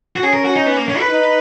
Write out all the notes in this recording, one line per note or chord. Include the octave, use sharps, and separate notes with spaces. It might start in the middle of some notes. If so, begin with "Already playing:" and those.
F#4
C#4 G#4
A#4
F#4
D#4
B3
A#3
C#4
B4
D#4